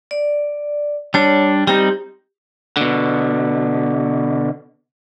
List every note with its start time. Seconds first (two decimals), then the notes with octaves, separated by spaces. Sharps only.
0.11 D5
1.14 G3 D4 C#5
1.67 G3 C4 D#4 G4
2.77 B2 D3